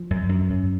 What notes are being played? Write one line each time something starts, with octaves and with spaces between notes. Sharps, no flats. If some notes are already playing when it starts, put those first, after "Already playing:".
Already playing: F3
F#2
F#2
F#2